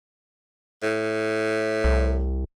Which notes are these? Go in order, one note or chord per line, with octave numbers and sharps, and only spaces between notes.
A2
C2